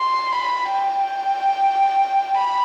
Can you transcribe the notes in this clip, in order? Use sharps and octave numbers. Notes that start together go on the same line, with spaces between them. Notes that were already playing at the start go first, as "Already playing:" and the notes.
Already playing: C6
B5
G5
B5